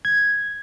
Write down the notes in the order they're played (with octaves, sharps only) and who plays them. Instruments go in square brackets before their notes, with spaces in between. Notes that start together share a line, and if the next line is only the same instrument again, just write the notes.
[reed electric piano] G#6